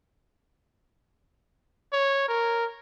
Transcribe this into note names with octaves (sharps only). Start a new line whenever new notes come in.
C#5
A#4